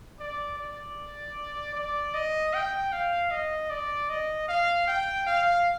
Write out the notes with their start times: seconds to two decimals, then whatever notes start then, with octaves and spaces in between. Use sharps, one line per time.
0.19 D5
0.58 D5
1.75 D5
2.14 D#5
2.54 G5
2.92 F5
3.31 D#5
3.70 D5
4.09 D#5
4.48 F5
4.87 G5
5.26 F5